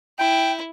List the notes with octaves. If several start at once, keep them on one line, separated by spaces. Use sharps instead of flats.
E4 G5